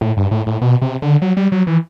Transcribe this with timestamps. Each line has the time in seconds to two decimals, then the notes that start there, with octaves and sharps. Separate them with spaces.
0.01 A2
0.17 G2
0.31 A2
0.47 A2
0.61 B2
0.82 C3
1.02 D3
1.22 F#3
1.37 G3
1.52 F#3
1.67 E3